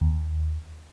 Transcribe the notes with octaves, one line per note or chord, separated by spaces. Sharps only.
D#2